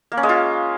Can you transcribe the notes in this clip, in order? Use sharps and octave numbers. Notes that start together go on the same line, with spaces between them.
A#3
C#4
G#3
F4